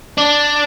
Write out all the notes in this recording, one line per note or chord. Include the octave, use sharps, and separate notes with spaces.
D4